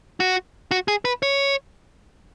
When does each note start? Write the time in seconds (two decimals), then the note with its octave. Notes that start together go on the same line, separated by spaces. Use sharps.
0.20 F#4
0.71 F#4
0.88 G#4
1.05 B4
1.23 C#5